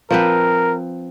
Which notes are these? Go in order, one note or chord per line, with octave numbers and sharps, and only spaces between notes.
F3 C4 A#4 B4